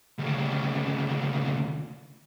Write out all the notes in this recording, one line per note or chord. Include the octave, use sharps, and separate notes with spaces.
D2 C#3